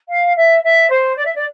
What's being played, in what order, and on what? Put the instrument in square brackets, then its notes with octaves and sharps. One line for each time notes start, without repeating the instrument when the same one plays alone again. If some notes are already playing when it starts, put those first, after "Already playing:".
[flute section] F5
E5
E5
C5
D5
E5
D5